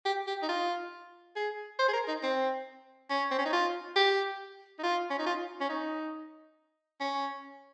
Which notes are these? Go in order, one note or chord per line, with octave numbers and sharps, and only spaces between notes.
G4
G4
D#4
F4
G#4
C5
G#4
A#4
D#4
C4
C#4
C4
C#4
D#4
F4
G4
D#4
F4
C#4
D#4
F4
C#4
D#4
C#4